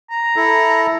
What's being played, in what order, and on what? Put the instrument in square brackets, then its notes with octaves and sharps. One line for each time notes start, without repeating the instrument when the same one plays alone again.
[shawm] A#5
[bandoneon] E4 A4